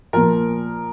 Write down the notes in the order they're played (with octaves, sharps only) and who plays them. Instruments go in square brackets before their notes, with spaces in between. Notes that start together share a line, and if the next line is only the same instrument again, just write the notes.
[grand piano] A#2 F3 A#4